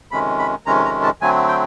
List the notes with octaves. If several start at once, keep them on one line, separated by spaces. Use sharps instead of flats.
F2 C3 D#3 G#3 C#4 B5
B5
F2 C3 D#3 G#3 C#4 A#5
A#5
A5
D3 F#3 A3 C4 G#5
G5